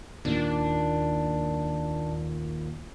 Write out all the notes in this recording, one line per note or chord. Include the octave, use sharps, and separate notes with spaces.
D#2 A#2 D4